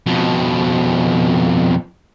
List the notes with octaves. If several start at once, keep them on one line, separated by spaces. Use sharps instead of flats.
F2 B2